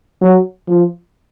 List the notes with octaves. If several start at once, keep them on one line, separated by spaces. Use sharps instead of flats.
F#3
F3